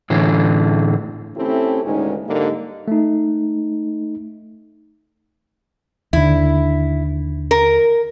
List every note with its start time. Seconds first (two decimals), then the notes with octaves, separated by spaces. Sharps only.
0.10 A2 D3 E3
1.37 A3 C4 C#4 E4 G4 A4
1.84 D2 A#2 D#3 G#3 C#4 D#4
2.27 G#2 D3 G3 A#3 D#4 G4
2.88 A3 D#4
6.13 D#2 D3 E4
7.51 A#4